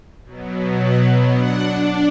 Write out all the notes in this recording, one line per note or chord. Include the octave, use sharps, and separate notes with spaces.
B2 F#3 B3
F#5
D4 F#5